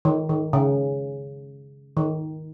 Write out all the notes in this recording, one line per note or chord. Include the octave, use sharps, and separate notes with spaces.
D#3
D#3
C#3
D#3